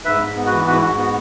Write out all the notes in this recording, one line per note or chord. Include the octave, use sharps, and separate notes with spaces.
G#2 B4 E5
G#2
B3
F#4 B4
E3
G#2 F#4 B4
E4
G#2 F#4
B3 F#4